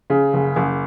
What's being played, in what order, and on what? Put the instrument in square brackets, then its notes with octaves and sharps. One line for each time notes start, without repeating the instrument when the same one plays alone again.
[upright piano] C#3
F#1
F#1